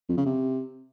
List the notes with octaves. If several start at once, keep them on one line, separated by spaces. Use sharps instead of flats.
F2
C#3
C3